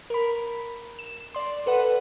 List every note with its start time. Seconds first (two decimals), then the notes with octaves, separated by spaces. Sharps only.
0.10 A#4 B5
0.99 E7
1.34 D5 C6
1.66 A4 B4 F#5